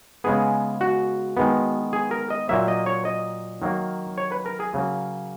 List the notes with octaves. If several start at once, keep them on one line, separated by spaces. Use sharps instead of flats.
C#3 G#3 B3 G#4
F#4
D#3 G#3 B3
G#4
A#4
D#5
A#2 F#3 A#3 E5
D#5
C#5
D#5
D#3 F#3 A#3
C#5
B4
A#4
G#4
C#3 F#3 A#3